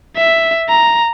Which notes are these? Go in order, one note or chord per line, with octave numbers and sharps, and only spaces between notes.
E5
A#5